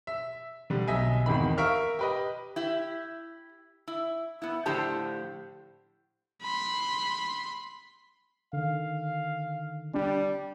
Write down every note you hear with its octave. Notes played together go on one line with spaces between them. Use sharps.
E5
D3 G3
B1 D#5 E5 G#5
G#1 E2 D#3 B5
A#4 E5 F5 C#6 F6
G4 B4 D#5
E4 G4
E4
B3 E4
A2 D3 F3 G4 C5 A5
B5 C6
D3 D#3 F5
G3 D4